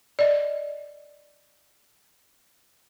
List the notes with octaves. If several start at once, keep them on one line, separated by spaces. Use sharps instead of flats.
D5 D#5